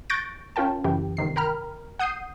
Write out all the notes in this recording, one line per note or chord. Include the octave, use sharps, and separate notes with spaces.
C#6 F#6 G6 A6 A#6 D7
C#4 F4 A#4 G5 A5
F#2 C#3 E3 G4 G5
G1 C3 D#3 C7
A#4 G5 A#5 B5 F6
F#5 D#6 G6 C7 D#7